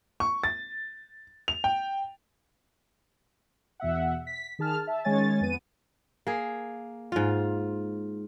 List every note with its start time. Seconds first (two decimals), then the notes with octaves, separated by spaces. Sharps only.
0.20 C#6
0.44 A6
1.48 F7
1.64 G5
3.80 E2 B2 E5 F#5
4.27 B6
4.59 D#3 G#4 A5 F6
4.87 E5 A5
5.04 D#3 G#3 C#4 C#5 G#5 A6
5.41 F2 B3 D#7
6.27 A#3 G#4
7.12 G#2 F4